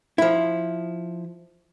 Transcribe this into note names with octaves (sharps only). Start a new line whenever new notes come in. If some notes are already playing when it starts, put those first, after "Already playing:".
F3 E4